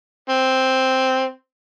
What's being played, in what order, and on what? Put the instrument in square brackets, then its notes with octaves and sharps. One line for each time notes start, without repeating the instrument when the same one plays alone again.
[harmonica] C4